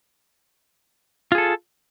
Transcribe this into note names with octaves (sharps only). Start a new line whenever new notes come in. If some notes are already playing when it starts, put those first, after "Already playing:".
F4 G#4 A4